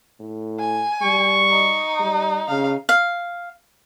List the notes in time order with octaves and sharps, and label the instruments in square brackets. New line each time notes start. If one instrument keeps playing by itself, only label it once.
[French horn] A2
[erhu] G#5
[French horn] G3 [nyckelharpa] C#6
[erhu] D#4
[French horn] G3
[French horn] C#3 [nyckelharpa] F5
[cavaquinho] F5